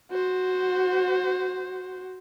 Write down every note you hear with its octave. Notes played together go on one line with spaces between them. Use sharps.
F#4 C5